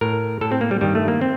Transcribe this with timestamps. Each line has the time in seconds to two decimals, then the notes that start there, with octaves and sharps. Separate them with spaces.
0.01 A2 A#4
0.41 A2 A4
0.52 C4
0.61 A#3
0.71 G3
0.81 G2 D#3 G3
0.95 A3
1.08 A#3
1.21 C4